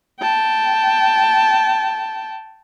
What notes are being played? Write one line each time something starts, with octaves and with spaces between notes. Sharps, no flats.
G5 A5